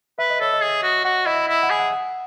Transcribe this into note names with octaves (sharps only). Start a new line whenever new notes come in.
B4 E5
D#5
A4 C#5
D#5
G#4
F#4
F#4 F#5
E4 D#5
E5
E4
F#5
G#4 G#5
F#5